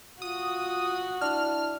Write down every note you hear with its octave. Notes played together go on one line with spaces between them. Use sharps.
F4 F#4 D#6
D4 E4 F6